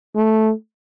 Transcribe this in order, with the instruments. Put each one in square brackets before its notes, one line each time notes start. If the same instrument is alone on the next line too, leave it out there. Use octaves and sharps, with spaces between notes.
[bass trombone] A3